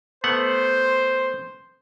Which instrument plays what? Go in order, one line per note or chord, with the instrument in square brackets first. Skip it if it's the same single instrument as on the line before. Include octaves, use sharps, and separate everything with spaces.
[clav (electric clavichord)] A3 B3 F#5 [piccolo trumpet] C5